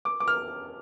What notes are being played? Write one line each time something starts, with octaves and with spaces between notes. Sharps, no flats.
D6
D6
F6